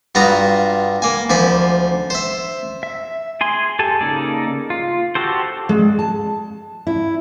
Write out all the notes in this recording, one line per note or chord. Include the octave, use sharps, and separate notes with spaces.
G2 F4 F#4 A#5 D#6
A#3 G#5
D2 F3 G#5 B5
C5 E5
E5
G#4 G#5 C6
G4 A4 G#5 A5
C#3 A#3 D#4 A4 D5
F4
F#4 G4 A4 C5
G#3
A5
E4